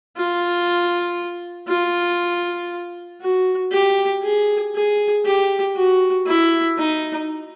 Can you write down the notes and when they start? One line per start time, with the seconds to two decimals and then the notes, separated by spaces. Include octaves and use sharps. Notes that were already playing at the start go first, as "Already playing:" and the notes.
0.17 F4
1.68 F4
3.21 F#4
3.72 G4
4.23 G#4
4.75 G#4
5.25 G4
5.76 F#4
6.26 E4
6.78 D#4